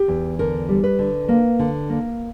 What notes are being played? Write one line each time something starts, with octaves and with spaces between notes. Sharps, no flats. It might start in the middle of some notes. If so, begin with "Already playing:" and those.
Already playing: G4
E2
D3 A#4
G3
B4
D3
A#3
D3
A#3